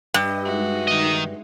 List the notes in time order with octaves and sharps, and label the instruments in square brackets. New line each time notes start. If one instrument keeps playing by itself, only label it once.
[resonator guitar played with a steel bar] G2 [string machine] G4 D#5 E5
[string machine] G#3 D#4 [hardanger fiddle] F#4 E5
[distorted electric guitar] D#3 D#5